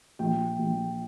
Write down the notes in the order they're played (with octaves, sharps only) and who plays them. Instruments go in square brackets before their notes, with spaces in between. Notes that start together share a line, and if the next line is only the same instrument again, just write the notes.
[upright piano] A#1 G5
A#1